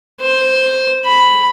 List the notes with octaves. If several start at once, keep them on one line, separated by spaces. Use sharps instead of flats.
C5
B5